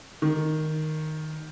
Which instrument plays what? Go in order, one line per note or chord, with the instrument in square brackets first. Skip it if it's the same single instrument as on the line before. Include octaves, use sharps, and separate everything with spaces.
[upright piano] D#3